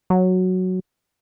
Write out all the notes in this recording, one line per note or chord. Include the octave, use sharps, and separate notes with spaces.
F#3